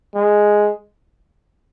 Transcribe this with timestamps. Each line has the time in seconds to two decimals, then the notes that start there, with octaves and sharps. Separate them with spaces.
0.15 G#3